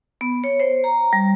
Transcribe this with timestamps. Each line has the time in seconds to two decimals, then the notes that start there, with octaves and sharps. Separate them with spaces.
0.21 B3
0.44 C#5
0.60 C5
0.84 A#5
1.13 G3